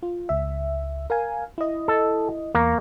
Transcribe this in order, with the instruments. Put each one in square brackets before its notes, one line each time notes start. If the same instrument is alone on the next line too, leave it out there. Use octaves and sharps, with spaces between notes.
[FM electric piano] F4
C#2 E5
A#4 F5 G#5
E4 D#5
[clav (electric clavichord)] A4
[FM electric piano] E2 A#5 C#6 [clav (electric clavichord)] A#3